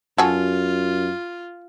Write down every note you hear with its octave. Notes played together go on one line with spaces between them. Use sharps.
F#2 F4 F#4 G#4 A4